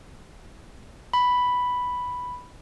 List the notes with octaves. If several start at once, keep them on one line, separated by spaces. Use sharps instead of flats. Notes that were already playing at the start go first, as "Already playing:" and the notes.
B5